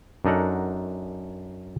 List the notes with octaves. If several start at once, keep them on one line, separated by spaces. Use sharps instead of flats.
F#2 D4 D#4 A4 A#4 F#5